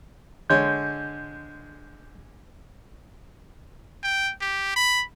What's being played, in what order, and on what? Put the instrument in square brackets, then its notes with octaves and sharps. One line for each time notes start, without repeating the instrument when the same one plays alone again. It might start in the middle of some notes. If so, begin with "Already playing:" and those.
[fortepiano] D3 G#3 C#5 [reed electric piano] G6
[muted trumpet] G5
G4
B5